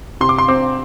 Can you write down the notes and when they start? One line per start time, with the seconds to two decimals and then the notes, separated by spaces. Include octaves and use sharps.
0.21 C3 C6
0.29 D6
0.38 C6
0.48 C4 D6